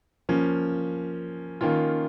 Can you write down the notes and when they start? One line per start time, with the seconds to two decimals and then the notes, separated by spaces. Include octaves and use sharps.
0.29 F3 A#3 C#4
1.61 D#3 A#3 C#4 F4